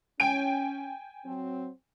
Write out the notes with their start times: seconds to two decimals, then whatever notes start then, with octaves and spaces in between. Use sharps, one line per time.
0.20 C#4 G5 G#5 D7
1.26 F#3 C4